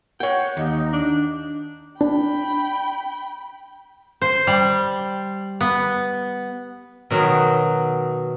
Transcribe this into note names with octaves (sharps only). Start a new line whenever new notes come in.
C#5 F#5 G5
D#2 D#4
D4
D4 G5 B5
C5
G3
B3
B2 D#3 F#3